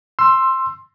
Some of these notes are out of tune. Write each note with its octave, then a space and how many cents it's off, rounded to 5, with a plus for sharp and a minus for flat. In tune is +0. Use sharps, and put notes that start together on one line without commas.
C6 +10 E6 +15